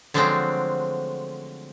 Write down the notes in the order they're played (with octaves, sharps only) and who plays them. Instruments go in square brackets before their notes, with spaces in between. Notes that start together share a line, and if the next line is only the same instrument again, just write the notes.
[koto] D3 F3 F#3 G#3 A3 C4